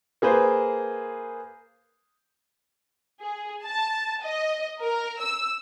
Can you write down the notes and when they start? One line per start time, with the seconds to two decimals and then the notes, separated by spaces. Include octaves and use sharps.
0.22 A#3 G#4 B4 C5
3.21 G#4
3.64 A5
4.22 D#5
4.82 A#4
5.22 E6